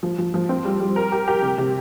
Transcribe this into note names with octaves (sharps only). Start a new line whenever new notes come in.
F3
F3
F3
C4
G3
G3
A#4
G4
G4
C3
C3